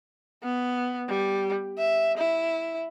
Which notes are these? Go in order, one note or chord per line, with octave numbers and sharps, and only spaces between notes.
B3
G3
E5
E4